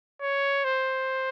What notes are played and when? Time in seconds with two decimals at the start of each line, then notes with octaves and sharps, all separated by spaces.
0.21 C#5
0.64 C5